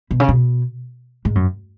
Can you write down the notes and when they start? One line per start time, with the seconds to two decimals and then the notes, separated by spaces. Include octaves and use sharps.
0.11 B2
0.20 C#3
0.28 B2
1.25 G#2
1.35 F#2